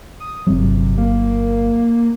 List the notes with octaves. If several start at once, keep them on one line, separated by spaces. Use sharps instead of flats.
D#6
G1 C3 F#3
A#3